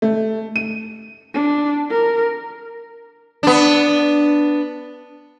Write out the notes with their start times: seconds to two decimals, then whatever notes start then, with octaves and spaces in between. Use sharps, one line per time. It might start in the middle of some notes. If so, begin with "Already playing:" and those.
0.02 A3
0.56 D#7
1.34 D4
1.90 A#4
3.43 B3 D4